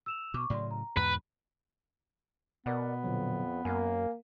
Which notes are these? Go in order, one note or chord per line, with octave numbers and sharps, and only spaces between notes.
E6 E7 F7
B2 C#6 D6
A2 C#3 F#3 D5 C6
A#5
E2 G#2 B2 B4
B2 B3 A#4 D5 F#5
F2 A#2 D3 F#3
F#2 A#3 A#4 F5 G#5